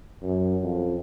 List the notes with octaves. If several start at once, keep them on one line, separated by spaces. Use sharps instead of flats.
F#2
F2